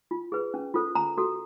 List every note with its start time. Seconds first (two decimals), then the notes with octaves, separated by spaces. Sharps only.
0.11 F4
0.32 G#4 B4
0.54 C#4
0.74 F4 A4 C5
0.95 C#4 A#5
1.17 F#4 A4